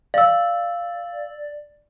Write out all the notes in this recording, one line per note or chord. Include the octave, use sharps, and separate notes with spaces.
D5 F5 E6